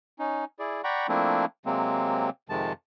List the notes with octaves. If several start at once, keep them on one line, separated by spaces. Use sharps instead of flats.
C#4 D#4
E4 G#4 D5
D5 F#5 G5 A#5 B5 C#6
F3 A3 A#3 C4 D4 E4
C3 F#3 G#3 A#3 C4
F2 C3 D#3 G#3 A5